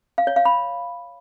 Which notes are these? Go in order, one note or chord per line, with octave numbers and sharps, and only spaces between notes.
F5
C#5
F5
B5